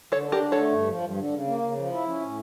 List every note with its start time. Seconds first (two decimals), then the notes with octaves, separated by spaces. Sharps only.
0.12 D3 A4 C#5
0.28 D4 G4 A#4
0.42 D3
0.52 A3 A4 C#5
0.72 G2
0.87 F3
1.02 G2
1.17 D3
1.32 C#3
1.47 A#3
1.62 C#3
1.77 F3
1.92 E4
2.07 C#4
2.22 A2